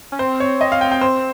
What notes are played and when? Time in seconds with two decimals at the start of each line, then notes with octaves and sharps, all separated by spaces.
0.12 C#4
0.19 C4 C5
0.40 C#5
0.61 D#5
0.72 F5
0.81 G5
0.92 G5
1.01 C5